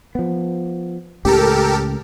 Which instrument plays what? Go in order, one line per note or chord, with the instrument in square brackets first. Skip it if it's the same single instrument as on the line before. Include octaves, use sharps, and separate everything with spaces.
[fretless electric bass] F3 B3
[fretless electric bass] C#2 A2 C#3 [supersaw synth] G4 A4 A#4